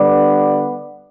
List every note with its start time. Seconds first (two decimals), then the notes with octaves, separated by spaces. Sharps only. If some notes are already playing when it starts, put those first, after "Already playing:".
Already playing: D3 G3 B3 D4 D5